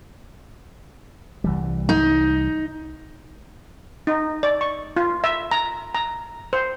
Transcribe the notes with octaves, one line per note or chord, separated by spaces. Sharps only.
C2 E3 G3
D#4
D#4
D5
C#6
F4
E5
A#5
A#5
C5